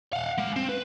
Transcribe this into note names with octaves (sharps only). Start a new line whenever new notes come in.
F5 F#5
G#3 F5
C4
B4